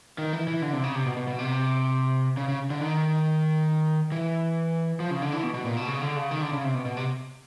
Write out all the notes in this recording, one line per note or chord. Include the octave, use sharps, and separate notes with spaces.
D#3
E3
E3
D3
C3
C#3
C3
B2
B2
B2
C3
C#3
C#3
D3
D#3
E3
F3
C#3
D3
E3
B2
B2
A#2
B2
C#3
D3
C#3
D#3
D3
C#3
C3
B2
B2
C3